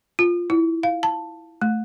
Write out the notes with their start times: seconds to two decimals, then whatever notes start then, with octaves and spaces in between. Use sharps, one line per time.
0.19 F4
0.50 E4
0.83 F5
1.03 A5
1.62 A3